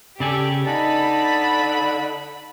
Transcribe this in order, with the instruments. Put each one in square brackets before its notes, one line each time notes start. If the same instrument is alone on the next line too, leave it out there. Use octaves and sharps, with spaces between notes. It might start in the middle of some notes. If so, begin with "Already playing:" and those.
[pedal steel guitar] C#3 D5 G#5 [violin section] G4 [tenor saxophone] A4
[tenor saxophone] D3 [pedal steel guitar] D#4 [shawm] A5 [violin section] B5